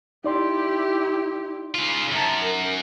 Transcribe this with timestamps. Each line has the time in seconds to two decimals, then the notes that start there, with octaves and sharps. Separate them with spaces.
0.24 D#4 E4 G4 D5 C6
1.74 C#3 F4
2.12 F#2 A5 A#5
2.43 A#4